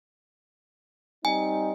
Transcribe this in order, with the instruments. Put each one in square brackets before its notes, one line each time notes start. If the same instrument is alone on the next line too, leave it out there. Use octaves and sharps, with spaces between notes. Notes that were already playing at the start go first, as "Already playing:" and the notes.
[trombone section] G3 C4 D#4 [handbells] G#5